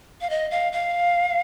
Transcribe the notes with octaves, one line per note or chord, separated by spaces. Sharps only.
F5
D#5
F5
F5